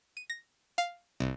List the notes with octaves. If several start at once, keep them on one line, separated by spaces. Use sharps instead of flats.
D#7
A#6
F5
C2